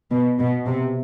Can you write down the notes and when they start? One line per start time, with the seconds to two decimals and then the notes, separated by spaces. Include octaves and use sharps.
0.11 B2
0.39 B2
0.66 C3